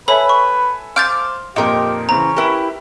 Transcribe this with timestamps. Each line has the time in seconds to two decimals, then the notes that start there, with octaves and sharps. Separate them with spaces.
0.08 A4 B4 C#5 E5 G#5 B5
0.29 C#6
0.96 C5 F5 D6 F6 G6 A6
1.56 F2 A#2 D#4 G4 A#4
2.09 C#3 E3 C4 C#4 A#5
2.37 E4 G4 A#4 B4 E5